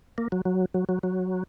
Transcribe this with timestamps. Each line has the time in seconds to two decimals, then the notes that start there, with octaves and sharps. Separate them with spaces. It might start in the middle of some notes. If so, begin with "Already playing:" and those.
0.18 A#3
0.32 F#3
0.45 F#3
0.74 F#3
0.89 F#3
1.03 F#3